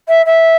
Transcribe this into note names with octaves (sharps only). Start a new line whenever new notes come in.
E5
E5